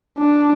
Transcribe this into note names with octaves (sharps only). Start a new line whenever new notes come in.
D4